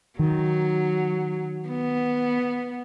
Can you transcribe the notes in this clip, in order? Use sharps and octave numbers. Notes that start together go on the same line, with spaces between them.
D#3 F#3
B3